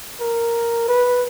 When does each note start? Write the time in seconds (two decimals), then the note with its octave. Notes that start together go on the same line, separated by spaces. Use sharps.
0.20 A#4
0.88 B4